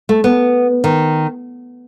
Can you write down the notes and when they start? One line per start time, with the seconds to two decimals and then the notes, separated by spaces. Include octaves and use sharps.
0.09 A3
0.24 B3
0.84 D#3